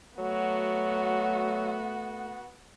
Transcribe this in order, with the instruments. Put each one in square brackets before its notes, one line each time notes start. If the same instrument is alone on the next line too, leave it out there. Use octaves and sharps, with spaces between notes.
[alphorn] F#3 [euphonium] A3 [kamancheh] B3 F#4